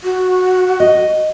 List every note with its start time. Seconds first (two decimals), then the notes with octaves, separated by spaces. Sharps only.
0.03 F#4
0.80 D#5